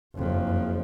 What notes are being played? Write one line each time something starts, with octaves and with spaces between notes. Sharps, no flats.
F#1 F2